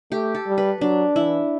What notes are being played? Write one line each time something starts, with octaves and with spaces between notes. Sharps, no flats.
A3 G4
A4
G3
B4
F#3 D4
E3 E4